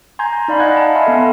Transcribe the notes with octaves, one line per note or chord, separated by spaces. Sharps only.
G#5 A#5 C6 G6 G#6
D#4 D5 F5 B5
D#5 F5 F#5 F#6 G#6
F#5 A5
E5 F5 G#5 B5 C6
B3 A4